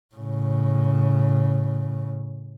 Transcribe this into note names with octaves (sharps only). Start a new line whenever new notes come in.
A2 C#3